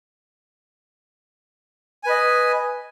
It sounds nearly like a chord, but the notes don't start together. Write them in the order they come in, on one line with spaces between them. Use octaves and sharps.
G#5 B4 D#5